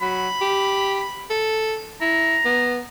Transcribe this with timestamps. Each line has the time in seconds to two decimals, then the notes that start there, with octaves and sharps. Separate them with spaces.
0.01 F#3 B5
0.41 G4
1.30 A4
2.01 E4 A#5
2.45 B3